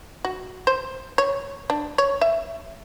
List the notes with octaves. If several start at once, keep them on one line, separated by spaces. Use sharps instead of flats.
F#4
C5
C#5
D4
C#5
E5